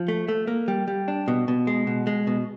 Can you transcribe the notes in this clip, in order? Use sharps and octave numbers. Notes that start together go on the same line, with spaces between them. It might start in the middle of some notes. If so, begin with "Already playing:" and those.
Already playing: F3
A3
A3
A#3
G3
G3
D4
B2
B2
G#3
B2
G#3
B2